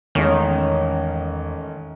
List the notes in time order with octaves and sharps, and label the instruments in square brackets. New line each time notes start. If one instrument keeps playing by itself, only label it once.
[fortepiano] A1 G#3 [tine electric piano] E2 [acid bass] D#3 [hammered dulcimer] C#4